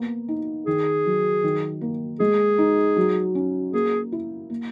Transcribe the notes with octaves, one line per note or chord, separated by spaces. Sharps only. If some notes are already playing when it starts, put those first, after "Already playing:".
Already playing: A#3 B3
D#4
D#3 G#4
F#3
D#3
A#3
G#3 G#4
D#4
F#3
C#4
A#3 G#4
E4
A#3